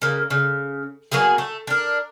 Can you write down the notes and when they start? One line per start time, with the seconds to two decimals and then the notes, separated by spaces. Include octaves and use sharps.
0.02 C#3 A#3
0.30 C#3
1.12 F#3 A#3 B3 G#4
1.38 A3
1.67 D4 A#4